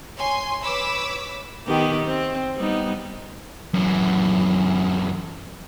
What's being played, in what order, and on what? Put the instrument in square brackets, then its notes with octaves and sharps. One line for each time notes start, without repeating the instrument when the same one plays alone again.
[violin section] C#5 G#5 C6
B4 C#5 B5 D6 E6 B6
[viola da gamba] D#3 B3 G4
C4
G3 B3 D#4
[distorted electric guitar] F#2 E3